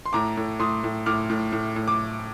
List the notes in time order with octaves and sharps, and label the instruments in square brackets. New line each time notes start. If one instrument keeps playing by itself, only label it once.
[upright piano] C6
A2 A#5 D6
A2
A2 C6 D#6
A2
A2 D6 F6
A2
A2
A2
D6